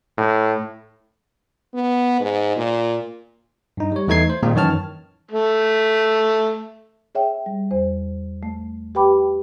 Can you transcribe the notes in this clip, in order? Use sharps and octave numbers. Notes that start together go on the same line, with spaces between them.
A2
B3
G#2
A#2
G2 D#4
G3 C#5
E2 E3 A3 D#4 G#6 C7
C5
A#2 D#3 G#3 A#3 C4 D#4
F#2 D#3 E3 C#5 A5 F6
A3
G#4 C#5 E5 G5
G3
E2 C5
A3
G4 B4 G5 B5 D6